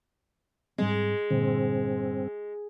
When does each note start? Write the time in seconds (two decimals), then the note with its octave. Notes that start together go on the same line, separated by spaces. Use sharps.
0.78 G#2 G3 G#3 C4
1.30 G2 A#2 D3 C4